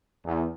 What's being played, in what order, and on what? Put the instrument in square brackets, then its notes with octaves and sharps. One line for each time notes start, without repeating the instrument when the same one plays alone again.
[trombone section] E2